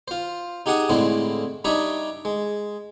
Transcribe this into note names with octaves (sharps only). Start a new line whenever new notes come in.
F4 C5
D#4 G4 G#4 F#5 D#6
A2 D3 G#3 C4 E4
G3 D4 D#4 C#5 D#5 E5
G#3